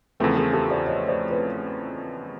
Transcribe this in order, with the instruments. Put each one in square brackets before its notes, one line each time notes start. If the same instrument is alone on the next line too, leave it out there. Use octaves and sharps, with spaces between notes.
[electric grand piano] E2 C#3 F3 A3 C4 [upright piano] A4 B4
[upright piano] G#4 A#4
G4 A4
C5 D5
C#5 D#5
C5 D5
B4 C#5